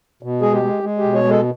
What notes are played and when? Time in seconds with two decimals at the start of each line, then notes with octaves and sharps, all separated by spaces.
0.23 B2
0.42 G#3 G#4
0.53 G4
0.63 G#3
0.83 G#3
0.98 G4
1.04 B2
1.14 C#5
1.24 G#3
1.30 A4